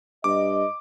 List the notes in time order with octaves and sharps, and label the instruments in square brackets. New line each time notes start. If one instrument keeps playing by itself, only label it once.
[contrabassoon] G2 [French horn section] D#5 [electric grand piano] D6